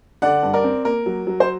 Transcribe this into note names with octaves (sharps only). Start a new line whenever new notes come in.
D3 D5 F#5
G2
A#4 D5
C4
A#3 A#4
F#3
F#3
C5